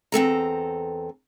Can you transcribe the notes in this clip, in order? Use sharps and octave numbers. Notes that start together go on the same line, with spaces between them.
E2 C4 A4 A#5